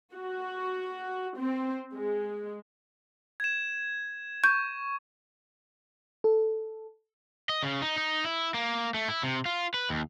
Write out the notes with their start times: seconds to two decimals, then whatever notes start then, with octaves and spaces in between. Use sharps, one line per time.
0.14 F#4
1.38 C4
1.94 G#3
3.40 G#6 E7
4.44 C#6 G6
6.24 A4
7.49 D#5
7.63 C#3
7.82 D#4
7.98 D#4
8.25 E4
8.54 A#3
8.94 A3
9.08 E4
9.23 C3
9.46 F4
9.74 B4
9.90 D#2